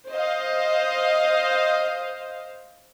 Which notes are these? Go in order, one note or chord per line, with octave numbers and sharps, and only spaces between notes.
C5 D#5 F5